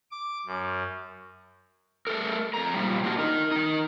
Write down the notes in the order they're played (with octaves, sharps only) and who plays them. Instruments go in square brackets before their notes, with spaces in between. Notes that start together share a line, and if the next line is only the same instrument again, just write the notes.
[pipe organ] D6
F#2
[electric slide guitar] A3 A4 A#4
F2 A#5
A#2 C#3 F3 G3
A#3 D4 F4 F#4 A#4
D#4 A#4
D#3 D#4